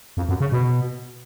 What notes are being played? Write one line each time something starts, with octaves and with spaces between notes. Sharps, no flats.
F2
F#2
C#3
B2